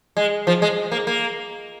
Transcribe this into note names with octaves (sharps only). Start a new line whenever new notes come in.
G#3
F3
G#3
A#3
A#3